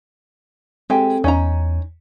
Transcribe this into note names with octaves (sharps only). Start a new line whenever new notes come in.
G#3 C4 G4 A4
E2 C#4 D#4 A#5